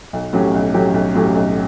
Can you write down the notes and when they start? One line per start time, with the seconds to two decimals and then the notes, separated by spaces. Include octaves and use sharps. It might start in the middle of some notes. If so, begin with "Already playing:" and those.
0.13 B1
0.33 A2 F#3 C#4 G4
0.54 B1
0.74 A2 F#3 C#4 G4
0.94 B1
1.15 A2 F#3 C#4 G4
1.35 B1